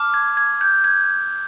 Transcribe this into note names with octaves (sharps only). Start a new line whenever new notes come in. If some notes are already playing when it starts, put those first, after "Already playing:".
Already playing: A5 D6 F6
G#6
G#6
G6
G#6